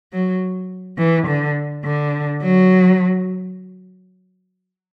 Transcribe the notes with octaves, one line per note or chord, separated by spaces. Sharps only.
F#3
E3
D3
D3
F#3